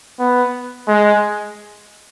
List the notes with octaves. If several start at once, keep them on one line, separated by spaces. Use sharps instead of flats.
B3
G#3